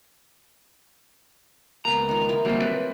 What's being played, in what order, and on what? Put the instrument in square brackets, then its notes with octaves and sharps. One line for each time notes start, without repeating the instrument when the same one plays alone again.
[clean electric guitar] C#2 A#5 [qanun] A#3 B3
[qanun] D#3 F4
E4 A#4 D#5
[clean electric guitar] D3 G3 A#3 [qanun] F#3 C4
[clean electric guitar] B4